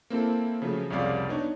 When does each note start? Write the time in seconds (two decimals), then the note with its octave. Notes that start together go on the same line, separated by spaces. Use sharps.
0.10 A#3 C4 E4 A4
0.62 C#3 F3 F#3 A3
0.90 C2 F2 C#3 C#5 D5 F5
1.29 B3 D4 D#4 C#5